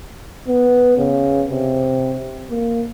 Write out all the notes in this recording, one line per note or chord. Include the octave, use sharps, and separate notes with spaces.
B3
C#3
C3
A#3